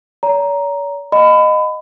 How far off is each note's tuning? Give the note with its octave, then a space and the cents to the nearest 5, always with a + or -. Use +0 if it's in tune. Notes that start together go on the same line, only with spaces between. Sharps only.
C#5 +45 A#5 +5
D#5 -10 F#5 -45 B5 +30